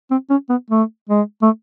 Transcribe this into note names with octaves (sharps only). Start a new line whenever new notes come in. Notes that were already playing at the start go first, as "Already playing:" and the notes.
C4
C#4
B3
A3
G#3
A3